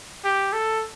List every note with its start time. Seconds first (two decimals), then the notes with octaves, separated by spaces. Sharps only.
0.24 G4
0.53 A4